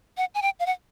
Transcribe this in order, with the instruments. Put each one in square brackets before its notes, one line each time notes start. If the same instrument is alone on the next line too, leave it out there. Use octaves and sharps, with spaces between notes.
[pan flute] F#5
G#5
G5
F5
F#5